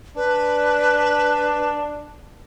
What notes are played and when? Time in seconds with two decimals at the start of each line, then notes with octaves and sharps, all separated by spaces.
0.16 D4 B4